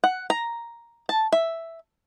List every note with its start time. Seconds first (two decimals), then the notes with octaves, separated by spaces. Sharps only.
0.04 F#5
0.30 A#5
1.09 A5
1.32 E5